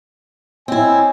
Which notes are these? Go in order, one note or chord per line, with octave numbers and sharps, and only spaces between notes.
C4 E4 C#5 D#5 G#5